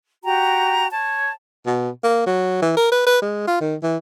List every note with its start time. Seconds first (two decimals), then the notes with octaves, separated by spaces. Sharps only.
0.24 F#4 G4 G5 A#5
0.90 C#5 A5
1.67 B2
2.04 A#3
2.26 F#3
2.62 E3
2.77 A#4
2.92 B4
3.07 B4
3.22 G#3
3.47 F4
3.61 D#3
3.83 E3